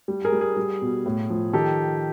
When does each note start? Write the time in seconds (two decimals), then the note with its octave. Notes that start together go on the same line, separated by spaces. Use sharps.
0.08 G3
0.25 G#4 A#4
0.32 G3
0.41 G#4
0.57 G3
0.82 B2
1.06 A2
1.30 F3
1.53 D#3 G4 A4